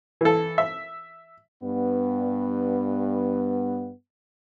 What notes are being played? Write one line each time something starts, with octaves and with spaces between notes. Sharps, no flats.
E3 A4
E5
G2 B3